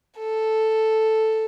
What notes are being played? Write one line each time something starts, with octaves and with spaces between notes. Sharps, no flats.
A4